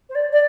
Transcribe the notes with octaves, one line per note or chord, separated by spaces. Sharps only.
C5
D5
D5